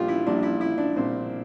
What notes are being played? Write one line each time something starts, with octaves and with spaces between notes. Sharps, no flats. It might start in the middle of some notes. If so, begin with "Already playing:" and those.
Already playing: A#1 A#2 G3 D4 F4 G4
E4
A#1 A#2 G3 D4
E4
E4
D4
A#1 A#2 G3 C4